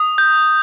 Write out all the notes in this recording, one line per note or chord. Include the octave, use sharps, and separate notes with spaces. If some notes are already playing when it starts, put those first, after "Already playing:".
Already playing: D#6
G6